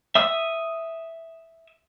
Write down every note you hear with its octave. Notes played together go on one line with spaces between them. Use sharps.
E5 D#6 E6